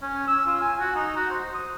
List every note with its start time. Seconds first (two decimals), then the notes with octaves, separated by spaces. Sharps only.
0.02 C#4
0.27 E6
0.46 F4
0.61 G#5
0.80 F#4
0.95 D#4
1.17 F#4
1.30 C5
1.54 D#6